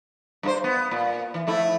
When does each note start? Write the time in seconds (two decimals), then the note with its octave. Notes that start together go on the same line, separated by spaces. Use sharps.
0.43 G2 D#4 C5
0.64 B3
0.91 A#2
1.34 E3
1.47 F2 A3 E4